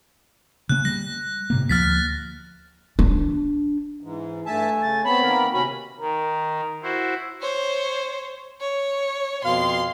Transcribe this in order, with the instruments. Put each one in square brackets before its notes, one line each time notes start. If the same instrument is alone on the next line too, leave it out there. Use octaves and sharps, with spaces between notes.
[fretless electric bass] C#3 A#3 [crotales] F#6
[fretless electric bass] G3 [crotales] A#6
[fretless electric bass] A2 C3 A#3
[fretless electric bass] D2 F3 A#3 [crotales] F6 A6 B6
[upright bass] D4
[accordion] G#2 [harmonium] E3
[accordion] G2 E5 A5 [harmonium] A3 G#5
[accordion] C#3 [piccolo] A6
[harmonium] B3 C4 [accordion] C#5 A5 [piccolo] B5
[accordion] D#3 A#3 A#4
[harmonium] C3 [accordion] C#4 F#4 [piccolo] B5
[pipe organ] D#3 [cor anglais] A#4
[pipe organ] E4 F#4 C5
[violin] C5 C#5
C#5
[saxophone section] F2 B2 F5 [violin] C6